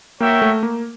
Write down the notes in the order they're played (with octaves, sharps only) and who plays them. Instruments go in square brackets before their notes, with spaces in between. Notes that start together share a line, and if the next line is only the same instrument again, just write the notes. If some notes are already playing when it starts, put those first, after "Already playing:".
[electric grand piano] A#3 [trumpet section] F#4 A#4 C#5 E5 G5
[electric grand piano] A3
A#3